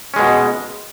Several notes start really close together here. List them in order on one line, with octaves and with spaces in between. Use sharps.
C#4 G#3 B2